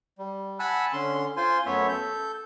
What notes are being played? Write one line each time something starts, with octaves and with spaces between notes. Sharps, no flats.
G3
F#5 G#5 A5 B5 E6 F#6
D3 C#4 C6
F4 C5 G#5 C6
F#2 A3 B3 C#5 E5
A4 G6